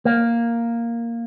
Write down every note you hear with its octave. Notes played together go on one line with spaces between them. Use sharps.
A#3